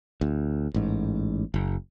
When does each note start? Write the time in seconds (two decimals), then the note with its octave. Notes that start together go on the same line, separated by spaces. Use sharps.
0.21 D2
0.74 A1 G#2
1.54 F#1